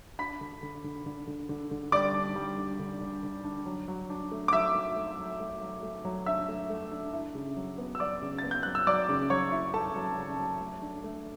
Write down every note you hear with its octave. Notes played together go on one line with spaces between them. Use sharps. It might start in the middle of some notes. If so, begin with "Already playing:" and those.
D4 B5 B6
D3
D3
D3
D3
D3
D3
D3
G3 D5 D6
D4
G3
D3
D3
D3
D3
D4
F#3
F#3
D4
A3
D6
F#3 E5 E6
A3
A3
F#3
A3
F#3
A3
F#3
D4 E5 E6
A3
A3
D4
E4
C#3
F#3
B3
E6
F#3 D5 D6
C#3
A6
B3
G6
F#3 F#6
E6
F#3 D5 D6
C#3
F#3 C#5 C#6
E4
F#3 A4 A5
F#3
C#3
F#3
A3
D4
A3